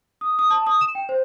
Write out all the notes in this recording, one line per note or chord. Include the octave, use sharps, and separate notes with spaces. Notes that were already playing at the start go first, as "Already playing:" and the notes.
D#6
D#6
A5
D#6
E7
G5
C5